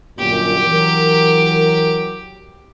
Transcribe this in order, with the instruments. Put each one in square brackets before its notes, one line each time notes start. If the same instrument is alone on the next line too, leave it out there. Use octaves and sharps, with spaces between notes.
[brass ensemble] G1 F#2 A#2 [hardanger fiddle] G4
[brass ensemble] E3 F#3 A#4